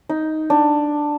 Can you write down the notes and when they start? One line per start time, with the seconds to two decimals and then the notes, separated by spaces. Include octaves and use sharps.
0.09 D#4
0.50 D4